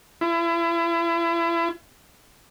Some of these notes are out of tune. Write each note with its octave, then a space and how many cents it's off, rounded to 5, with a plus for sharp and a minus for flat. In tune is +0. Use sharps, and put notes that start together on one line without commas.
E4 +35